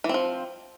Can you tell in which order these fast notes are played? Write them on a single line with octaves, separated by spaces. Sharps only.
E3 C4 F3